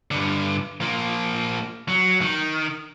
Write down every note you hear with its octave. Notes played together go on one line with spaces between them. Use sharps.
G2 D3
F3 A#3
F#3
D#3